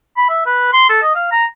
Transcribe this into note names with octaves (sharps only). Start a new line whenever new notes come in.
B5
E5
B4
C6
A4
D#5
F5
A#5